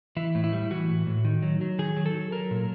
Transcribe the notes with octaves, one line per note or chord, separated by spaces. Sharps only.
E3 E4
A2
E4
G3
E3 F#4
A2
A2
D#3
F#3
F#3
D#3 G#4
F#3
A4
F#3
F#3 A#4
A#2